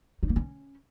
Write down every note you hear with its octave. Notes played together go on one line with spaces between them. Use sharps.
D#4
A#3
C#4